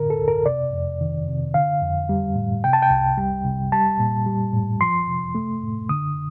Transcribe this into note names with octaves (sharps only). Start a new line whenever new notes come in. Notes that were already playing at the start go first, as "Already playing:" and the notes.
Already playing: A2 D3 A#4
A4
D2
A#4
C3 D5
F2
D#3
C3
D3 F5
F2
G3
A2
C3 G5
A5
G5
C2
G3
C3
G3 A5
A#2
G3
A2
F3 C6
C3
A3
A2
D3 D#6